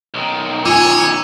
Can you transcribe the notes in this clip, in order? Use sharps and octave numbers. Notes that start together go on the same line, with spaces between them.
B1 D#3
F4 C#5 G#5 D6 E6 D#7